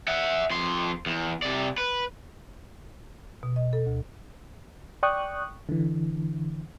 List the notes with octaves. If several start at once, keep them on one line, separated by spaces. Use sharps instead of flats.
E5 F#5
F2 C6
E2
C3 D5
B4
B2
D#5
A4
D2
D5 G5 C#6 D#6 F#6
D3 E3